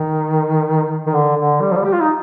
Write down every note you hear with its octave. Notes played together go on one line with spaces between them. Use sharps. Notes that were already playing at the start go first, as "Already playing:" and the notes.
Already playing: D#3
D#3
D3
D3
G3
F3
G3
G4
F4
D#4